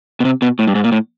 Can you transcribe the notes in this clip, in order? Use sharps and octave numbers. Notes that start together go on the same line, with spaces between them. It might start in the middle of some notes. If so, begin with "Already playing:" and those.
B2
C3
B2
A2
G2
G#2
A#2
A2